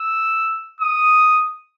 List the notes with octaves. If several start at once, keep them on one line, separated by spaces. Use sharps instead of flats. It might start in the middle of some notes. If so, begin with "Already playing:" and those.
Already playing: E6
D#6